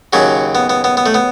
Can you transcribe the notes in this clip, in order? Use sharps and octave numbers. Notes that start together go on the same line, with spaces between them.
D#2 C#3 F#3 C#4
B3
B3
B3
B3
A3
B3